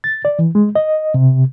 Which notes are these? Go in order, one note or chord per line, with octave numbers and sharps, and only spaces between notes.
A6
D5
E3
G#3
D#5
C3